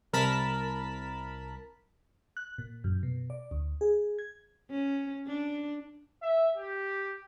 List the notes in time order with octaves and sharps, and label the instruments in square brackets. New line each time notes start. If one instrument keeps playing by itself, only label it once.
[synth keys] C2 A#4 A5 B5 B6
[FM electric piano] F#6
A#2
F#2
B2
D5
D2
G#4
G#6
[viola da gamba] C#4
D4
[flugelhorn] E5
G4